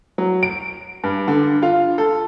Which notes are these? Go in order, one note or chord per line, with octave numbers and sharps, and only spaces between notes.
F#3
D7
G2
D3
F4
A4